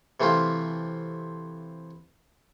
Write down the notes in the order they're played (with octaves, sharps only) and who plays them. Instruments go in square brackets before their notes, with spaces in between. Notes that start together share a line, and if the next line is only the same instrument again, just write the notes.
[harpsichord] C3 E3 A3 C4 F4